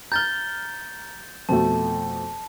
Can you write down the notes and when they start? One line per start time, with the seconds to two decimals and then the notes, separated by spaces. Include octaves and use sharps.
0.12 A#5 F6 G6 A6 G7
1.49 F2 B2 A3 A5